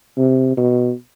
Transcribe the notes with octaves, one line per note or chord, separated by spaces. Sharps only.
C3
B2